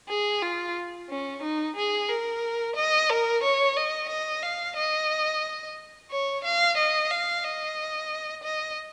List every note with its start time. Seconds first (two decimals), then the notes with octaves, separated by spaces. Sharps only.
0.09 G#4
0.42 F4
1.09 C#4
1.42 D#4
1.76 G#4
2.09 A#4
2.76 D#5
3.10 A#4
3.43 C#5
3.77 D#5
4.09 D#5
4.42 F5
4.76 D#5
6.10 C#5
6.44 F5
6.78 D#5
7.11 F5
7.44 D#5
8.43 D#5